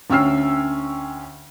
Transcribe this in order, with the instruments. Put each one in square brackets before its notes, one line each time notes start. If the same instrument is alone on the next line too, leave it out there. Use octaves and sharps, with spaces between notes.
[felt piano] D2 C#4 G5 E6 F6 C7